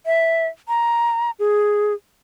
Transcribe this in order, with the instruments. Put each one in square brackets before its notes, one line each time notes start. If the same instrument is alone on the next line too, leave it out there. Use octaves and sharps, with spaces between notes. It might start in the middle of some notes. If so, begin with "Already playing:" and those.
[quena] E5
A#5
G#4